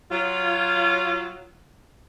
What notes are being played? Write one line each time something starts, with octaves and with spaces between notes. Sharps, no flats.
F#3 F4